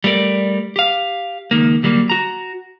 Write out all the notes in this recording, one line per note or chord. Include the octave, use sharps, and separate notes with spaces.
G3 A3 A#4 D5
G4 F5
C#2 D#3 A#3
D2 F#3 G3 A3 A#3
F#4 A#5